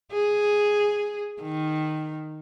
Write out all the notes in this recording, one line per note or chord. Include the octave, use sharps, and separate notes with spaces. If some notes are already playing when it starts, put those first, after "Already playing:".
G#4
D#3